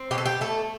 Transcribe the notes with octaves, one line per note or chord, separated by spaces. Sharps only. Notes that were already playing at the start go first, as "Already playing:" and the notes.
Already playing: C4
B2 G4
A4
G4
A3 A4